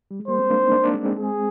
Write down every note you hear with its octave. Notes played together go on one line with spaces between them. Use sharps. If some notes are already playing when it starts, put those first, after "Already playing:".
G3
G#3
G3 A#3 C5
G#3 C4
A#3 D4
C4 D#4
A#3 D4
A#3 D4
G#3 C4
G#3 C4
G#4